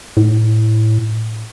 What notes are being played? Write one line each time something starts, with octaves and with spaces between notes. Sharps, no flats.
A2